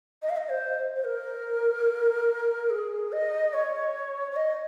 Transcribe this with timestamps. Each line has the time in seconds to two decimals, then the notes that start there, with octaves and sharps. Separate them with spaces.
0.22 D#5
0.29 F5
0.37 D#5
0.49 C5
0.96 C5
1.04 A#4
2.70 G#4
3.12 D#5
3.53 C#5
4.31 C#5
4.36 D#5